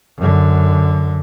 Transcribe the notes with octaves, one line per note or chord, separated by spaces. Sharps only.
F#2 D3